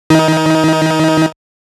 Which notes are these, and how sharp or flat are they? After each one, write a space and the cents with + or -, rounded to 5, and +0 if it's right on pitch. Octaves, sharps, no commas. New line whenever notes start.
D#3 +35 D#4 +25